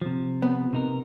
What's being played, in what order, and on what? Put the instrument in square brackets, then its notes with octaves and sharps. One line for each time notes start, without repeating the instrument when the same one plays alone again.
[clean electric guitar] C3 F3
[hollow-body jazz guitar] B3
[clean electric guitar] C3 D#4 A#4